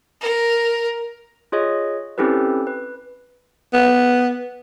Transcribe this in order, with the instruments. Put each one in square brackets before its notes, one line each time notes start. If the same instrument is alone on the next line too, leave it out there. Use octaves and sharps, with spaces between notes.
[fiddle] A#4
[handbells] F4 G#4 C#5 D#5
C4 C#4 E4 G4 A4 B4
B4
[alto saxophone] B3